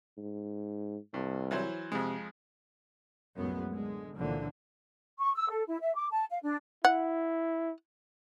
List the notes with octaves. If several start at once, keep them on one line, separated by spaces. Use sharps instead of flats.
G#2
C2 G2
E3 F#3 C5
F2 C3 G#3
C2 F#2 A2 G#3 B3
D3 G#3
C#2 A#2 D3 E3 F3 A#3
C#6
E6
A4
E4
E5
D6
A5
F5
D4
E4 F#5